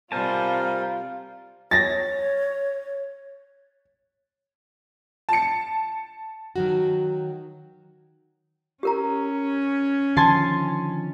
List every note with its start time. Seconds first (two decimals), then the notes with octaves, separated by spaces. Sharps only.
0.12 C3 G3 F4 A#4 C5 G#5 A5
1.71 C#5 A6 A#6
5.29 A5 C#7
6.56 D#3 F#3 F#4
8.83 C#4 G4 A#4 A#5
10.17 D3 D#3 F3 G#5 A5 C6